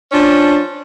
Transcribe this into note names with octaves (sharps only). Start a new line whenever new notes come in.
F3 C#4 D4